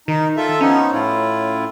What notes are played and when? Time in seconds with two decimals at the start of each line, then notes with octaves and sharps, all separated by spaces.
0.08 D#3 D#4
0.37 F4 A4 E5
0.61 F3 B3 C#4 D#4
0.92 A2 E4 F4